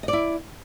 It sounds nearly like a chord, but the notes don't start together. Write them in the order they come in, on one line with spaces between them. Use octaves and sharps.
D#5 D5 E4